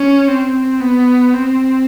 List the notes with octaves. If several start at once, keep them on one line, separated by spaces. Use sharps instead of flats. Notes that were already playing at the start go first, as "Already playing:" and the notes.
Already playing: C#4
C4
B3
C4